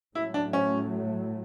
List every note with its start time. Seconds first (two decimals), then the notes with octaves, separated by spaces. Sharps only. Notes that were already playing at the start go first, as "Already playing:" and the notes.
0.15 A2 F#3 A3 E4
0.34 D4
0.53 C#4